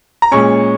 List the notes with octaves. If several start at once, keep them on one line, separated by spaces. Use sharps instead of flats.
A#5
A#2 G#3 C#4 C#6